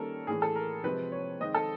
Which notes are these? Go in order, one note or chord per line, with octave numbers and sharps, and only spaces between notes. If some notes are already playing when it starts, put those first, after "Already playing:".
Already playing: D#3 G3 A#3 C#4 A4 A#4
A2 E3 A3 G#4
A4
A#4
C3 F3 G#3 C4 B4
C#5
D#3 G#3 C4 D#5
A4